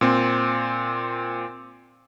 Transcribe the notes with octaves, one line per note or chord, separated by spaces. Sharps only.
A#2 C4